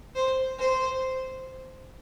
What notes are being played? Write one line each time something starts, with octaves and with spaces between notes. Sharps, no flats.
C5
C5